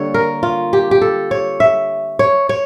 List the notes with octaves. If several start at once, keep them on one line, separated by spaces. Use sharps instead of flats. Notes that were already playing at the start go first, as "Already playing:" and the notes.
Already playing: D3 G3 A#3 D4 C#5
A#4
F4
G4
G4
A4
C#5
E5
C#5
C#5